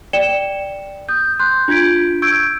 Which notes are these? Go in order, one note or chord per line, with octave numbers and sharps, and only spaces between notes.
D5 G5 C#7 E7 G7
D#6 G6
C6 F#6 G6
D4 F4 G6 G#6 B6 D7
C#6 E6 G6 G#6 D7